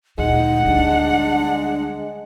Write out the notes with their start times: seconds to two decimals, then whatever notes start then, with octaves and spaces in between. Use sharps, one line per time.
0.18 D2 A#2 G#3 D#4 F#5
0.65 D2 G3 D4